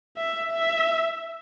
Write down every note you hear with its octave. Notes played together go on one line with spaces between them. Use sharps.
E5
E5